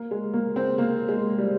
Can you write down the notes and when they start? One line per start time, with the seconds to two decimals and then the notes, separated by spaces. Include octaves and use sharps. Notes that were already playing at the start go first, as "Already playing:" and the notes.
Already playing: A#3
0.11 G#3
0.33 A#3
0.56 C4
0.78 A#3
1.08 G#3
1.38 G3